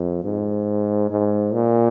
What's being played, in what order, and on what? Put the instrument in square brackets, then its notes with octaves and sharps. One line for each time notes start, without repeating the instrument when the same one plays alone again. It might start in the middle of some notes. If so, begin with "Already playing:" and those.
Already playing: [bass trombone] F2
G#2
G#2
A#2